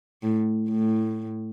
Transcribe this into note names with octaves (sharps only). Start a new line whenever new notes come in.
A2
A2